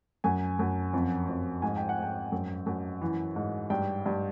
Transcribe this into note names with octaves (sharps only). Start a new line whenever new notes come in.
F#2 G#5
F#2
F2
F2
G#2 G#5
G5
F#5
G#2 G5
F#2
F#2
E3
G#2
G2 G5
G2